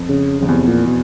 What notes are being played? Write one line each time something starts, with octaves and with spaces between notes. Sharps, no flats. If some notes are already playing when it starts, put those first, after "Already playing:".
Already playing: F2
C#3
F2 C#3
E2 C3
A#2
B2